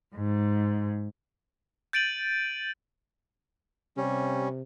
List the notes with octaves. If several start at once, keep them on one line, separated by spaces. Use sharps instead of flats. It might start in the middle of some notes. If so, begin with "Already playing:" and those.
G#2
G6 A6 D7 D#7 F#7
C3 G3 C#4